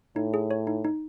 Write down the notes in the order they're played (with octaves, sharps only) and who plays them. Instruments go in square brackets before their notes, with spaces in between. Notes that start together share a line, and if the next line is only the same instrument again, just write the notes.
[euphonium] A2 [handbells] D#4
[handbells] G#4
C#5
D#4
D#4